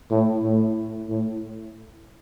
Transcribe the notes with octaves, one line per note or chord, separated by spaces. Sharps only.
A2
A2
A2